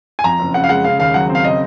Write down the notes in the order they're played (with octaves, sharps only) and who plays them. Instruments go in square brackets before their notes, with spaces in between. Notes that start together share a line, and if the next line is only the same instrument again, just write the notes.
[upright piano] G#5
[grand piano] F2 [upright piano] A#5
[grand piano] F#1
[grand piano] C#3 [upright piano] F#5
[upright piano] F5
[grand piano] G#3 [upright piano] F#5
[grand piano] C#3 [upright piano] F5
[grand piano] D#2 [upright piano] F5
[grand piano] F#3 [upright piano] F#5
[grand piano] C4
[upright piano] F5
[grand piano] C#3 [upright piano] D#5